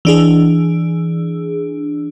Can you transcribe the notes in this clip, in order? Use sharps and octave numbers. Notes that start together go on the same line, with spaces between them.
E3 D4 G#4